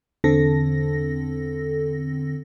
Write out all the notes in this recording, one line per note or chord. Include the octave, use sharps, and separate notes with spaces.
E2 D3 C4 A4 A#6